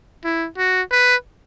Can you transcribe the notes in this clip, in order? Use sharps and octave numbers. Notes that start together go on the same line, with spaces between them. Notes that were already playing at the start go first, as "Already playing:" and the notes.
E4
F#4
B4